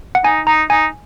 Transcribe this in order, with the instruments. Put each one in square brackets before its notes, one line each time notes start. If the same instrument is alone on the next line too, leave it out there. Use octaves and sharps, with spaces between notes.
[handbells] F#5
[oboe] D#4 [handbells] G#5
[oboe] D#4 [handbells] A#5
[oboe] D#4 [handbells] G#5